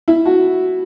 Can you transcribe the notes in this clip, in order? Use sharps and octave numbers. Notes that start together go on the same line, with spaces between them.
E4
F#4